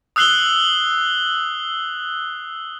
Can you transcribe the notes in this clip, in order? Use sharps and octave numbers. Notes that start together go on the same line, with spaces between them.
D#6 E6 F#6 C7 F#7 G7